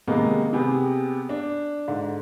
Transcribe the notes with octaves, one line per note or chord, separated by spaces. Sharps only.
C3 D#3 G#3 A#3 B3
C3 B3 G4 G#4
D4
G#2 D3